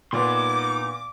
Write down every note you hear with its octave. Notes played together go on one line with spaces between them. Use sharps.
A#2 B3 D#4 C6 D6